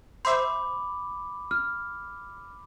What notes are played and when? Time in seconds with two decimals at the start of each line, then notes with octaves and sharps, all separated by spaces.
0.25 C5 E5 B5 D6
1.51 F6